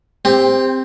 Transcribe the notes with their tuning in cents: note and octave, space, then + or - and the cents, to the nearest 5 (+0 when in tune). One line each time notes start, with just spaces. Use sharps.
C4 +0 G4 +25